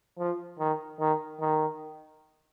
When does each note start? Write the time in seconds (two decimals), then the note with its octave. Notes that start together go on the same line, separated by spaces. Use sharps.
0.18 F3
0.59 D#3
1.00 D#3
1.41 D#3